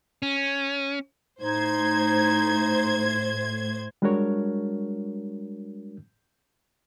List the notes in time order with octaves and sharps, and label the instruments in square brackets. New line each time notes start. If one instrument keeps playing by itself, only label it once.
[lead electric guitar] C#4
[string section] A2 C5 G#6 [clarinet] D#4
[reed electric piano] G3 G#3 D4 F#4 A#4 C#5